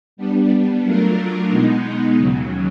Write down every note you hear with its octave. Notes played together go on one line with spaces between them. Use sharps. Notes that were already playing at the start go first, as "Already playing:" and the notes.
G3 B3 D4
F#3 A3 D4 F4 A#4
B2 G#3 B3 D#4
D#2 C#3 F#3